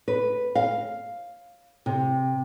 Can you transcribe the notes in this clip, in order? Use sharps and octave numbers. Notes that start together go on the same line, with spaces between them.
B4
F5
C3